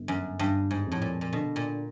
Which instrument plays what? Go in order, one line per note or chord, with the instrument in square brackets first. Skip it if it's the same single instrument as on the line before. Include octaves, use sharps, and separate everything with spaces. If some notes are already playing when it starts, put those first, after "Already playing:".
Already playing: [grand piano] G1
[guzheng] F#2
[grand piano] G1 [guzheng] G2
[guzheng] G#2
[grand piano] F2 [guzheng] A2
[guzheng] A#2
A#2
[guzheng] B2 [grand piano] D3
[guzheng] A#2